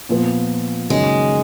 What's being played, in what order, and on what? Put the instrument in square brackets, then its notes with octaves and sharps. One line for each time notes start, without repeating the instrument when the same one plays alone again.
[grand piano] A#2 F3 B3
[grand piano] F#1 F#2 D#3 [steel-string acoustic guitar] G#3